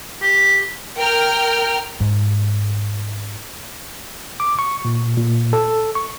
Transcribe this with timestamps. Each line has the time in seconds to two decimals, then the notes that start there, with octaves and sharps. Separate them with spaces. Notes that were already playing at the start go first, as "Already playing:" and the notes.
0.22 G4
0.98 A#4 G5 F6
2.01 G#2 G#3
4.40 D6
4.59 C#6
4.85 A#2
5.17 A#2
5.53 A4
5.95 C#6